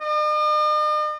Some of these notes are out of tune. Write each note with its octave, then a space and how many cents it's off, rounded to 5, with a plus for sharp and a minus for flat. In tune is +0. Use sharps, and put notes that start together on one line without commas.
D#5 -45